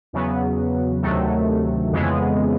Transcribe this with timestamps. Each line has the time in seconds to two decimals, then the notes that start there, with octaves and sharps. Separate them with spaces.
0.13 E2 C#3 F#3 B3
1.02 D2 C3 D#3 F#3 A3
1.92 F2 C#3 E3 G#3 B3